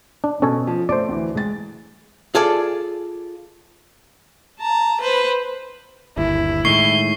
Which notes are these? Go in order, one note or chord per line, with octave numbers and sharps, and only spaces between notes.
D4
B2 C#4 A4 C#5
F3
A3 C5 D5 D7
D2 E3
G#3 A6
F4 G#4 A4 D5
A5 A#5
B4 C5
G1 D#2 E4
A2 D#3 G#3 C#6 C7 G7